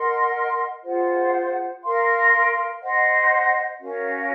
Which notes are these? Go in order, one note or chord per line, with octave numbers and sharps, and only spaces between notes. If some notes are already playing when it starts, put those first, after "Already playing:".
Already playing: A#4 D#5 F#5 C6
F4 G#4 C5 F#5
A#4 F5 C6
C5 D#5 F#5
C#4 F#4 A#4 F5